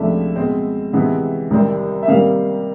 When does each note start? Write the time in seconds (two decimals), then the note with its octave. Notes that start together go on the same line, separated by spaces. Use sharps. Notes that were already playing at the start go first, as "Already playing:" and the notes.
Already playing: C#2 C3 F3 A3 D4 E5
0.36 B2 G#3 C4
0.93 C3 E3 G#3 B3
1.50 C2 C3 D#3 G3 C4
2.03 E5
2.08 C3 D#3 G3 A#3 F5